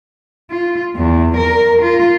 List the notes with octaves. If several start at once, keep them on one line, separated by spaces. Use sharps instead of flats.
F4
E2
A#4
F4